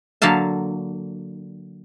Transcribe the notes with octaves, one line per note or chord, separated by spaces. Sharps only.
D3 F#3 A#3 F5 A5